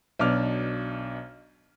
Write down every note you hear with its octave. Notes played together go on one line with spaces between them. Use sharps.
B1 B2 D4 D6 F6